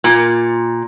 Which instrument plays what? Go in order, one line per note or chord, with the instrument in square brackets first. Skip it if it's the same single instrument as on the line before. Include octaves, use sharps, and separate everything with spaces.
[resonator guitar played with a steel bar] A#2